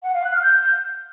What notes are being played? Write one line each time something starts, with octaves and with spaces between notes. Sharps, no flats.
F#5
F5
F#6
F6
G6